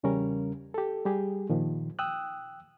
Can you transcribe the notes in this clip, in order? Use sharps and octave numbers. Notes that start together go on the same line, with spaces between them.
E2 C#3 G3 C#4 A#4
G4 A4
G3 G4 G#4
A#2 D#3 F3
G5 D#6 E6 F#6